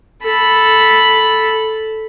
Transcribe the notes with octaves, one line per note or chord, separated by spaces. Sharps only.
A4 B5